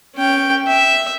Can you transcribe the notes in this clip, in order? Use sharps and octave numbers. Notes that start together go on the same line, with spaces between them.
C#4 G5
E5